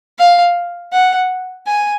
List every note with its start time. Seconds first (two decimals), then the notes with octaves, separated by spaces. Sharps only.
0.18 F5
0.92 F#5
1.67 G#5